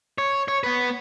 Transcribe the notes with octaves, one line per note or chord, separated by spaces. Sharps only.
C#5
C#5
B3 B4